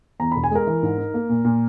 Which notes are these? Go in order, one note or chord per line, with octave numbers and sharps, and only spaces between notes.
E2 A#5
E1 B5
G#5
G#3 A#4
E3
G#2
D#4
A#3
A#2
A#2